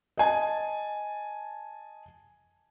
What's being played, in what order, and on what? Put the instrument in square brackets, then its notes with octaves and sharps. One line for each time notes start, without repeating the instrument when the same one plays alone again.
[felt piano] D#5 G#5 A5